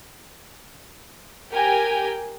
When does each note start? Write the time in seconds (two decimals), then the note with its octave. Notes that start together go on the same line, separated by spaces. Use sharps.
1.51 G4 A#4 G5 G#5